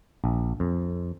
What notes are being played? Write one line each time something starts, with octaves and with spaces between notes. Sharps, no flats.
A#1
F2